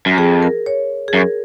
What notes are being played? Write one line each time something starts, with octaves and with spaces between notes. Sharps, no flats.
F#2
F2 G#4
A#4
C#5
G#4
F#2 A#4